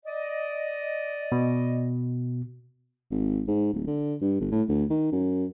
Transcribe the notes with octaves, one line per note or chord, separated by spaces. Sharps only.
D5 D#5
B2
G#1
G#2
D1
D3
G2
G1
A2
D2
D#3
F#2